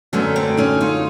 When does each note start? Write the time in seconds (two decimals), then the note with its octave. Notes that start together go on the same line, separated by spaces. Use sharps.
0.13 F#2 D3 F#3 A3 B3 C#4
0.36 C4 D4
0.57 C#4 D#4
0.81 D#4 F4